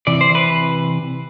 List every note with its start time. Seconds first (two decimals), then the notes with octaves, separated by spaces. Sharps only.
0.07 C3 E3 D5
0.21 C5
0.35 B4